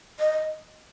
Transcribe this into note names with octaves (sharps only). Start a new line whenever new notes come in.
D#5